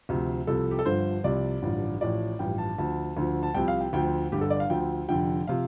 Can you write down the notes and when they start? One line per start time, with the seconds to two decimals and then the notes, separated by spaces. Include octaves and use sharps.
0.09 D2 C3 F3
0.47 C2 C3 F3 A4
0.71 G4
0.79 A4
0.86 G1 G2 D3 F3 C5
1.24 C2 C3 F3 D5
1.62 A1 G2 D3 F3
2.01 A1 A2 F3 D5
2.39 A1 G2 F3 G5
2.58 A5
2.78 D2 D3 F3 A5
3.17 D2 D3 F3
3.43 A5
3.54 C2 C3 F3 G5
3.68 F5
3.80 G5
3.93 D2 D3 F3 G5
4.32 G1 G2 D3 G4
4.41 A4
4.50 D5
4.60 F5
4.70 D2 D3 F3 G5
5.08 F1 F2 D3 F3 G5
5.48 C3 F3 F5